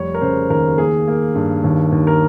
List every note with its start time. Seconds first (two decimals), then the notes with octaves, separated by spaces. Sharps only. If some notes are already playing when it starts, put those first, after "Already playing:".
Already playing: F1 G3 C#5
0.14 A#4
0.22 C#3 C5
0.50 D#2 A#4
0.78 A#3 G#4
1.08 A#3
1.35 G2
1.64 D#2
1.92 D#2
2.07 A#4